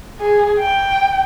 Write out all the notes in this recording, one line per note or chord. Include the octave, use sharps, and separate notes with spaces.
G#4
G5